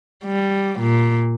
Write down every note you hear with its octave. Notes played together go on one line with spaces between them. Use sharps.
G3
A#2